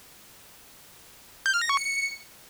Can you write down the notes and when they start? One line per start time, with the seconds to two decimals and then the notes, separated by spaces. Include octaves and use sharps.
1.46 G6
1.54 F6
1.62 A#6
1.69 C#6
1.77 C#7